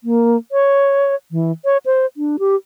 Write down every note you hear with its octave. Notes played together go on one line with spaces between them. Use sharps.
A#3
C#5
E3
C#5
C5
D4
G4